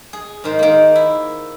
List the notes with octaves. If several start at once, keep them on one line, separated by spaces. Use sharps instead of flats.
G#4
G#2 D#3 C5
D#3 A#3
E4